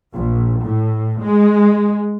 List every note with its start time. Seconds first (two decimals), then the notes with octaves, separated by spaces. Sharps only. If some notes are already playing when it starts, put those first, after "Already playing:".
0.13 A#1
0.63 A2
1.22 G#3